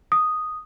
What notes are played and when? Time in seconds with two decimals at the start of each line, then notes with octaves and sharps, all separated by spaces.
0.12 D#6